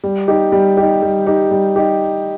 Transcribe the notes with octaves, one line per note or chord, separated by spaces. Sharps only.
G3
D#4 G4
G3
D#4 G4
G3
D#4 G4
G3
D#4 G4